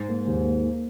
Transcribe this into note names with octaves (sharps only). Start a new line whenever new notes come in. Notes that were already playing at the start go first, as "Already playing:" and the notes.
Already playing: G#2
A#3
D#2
A#3
A#3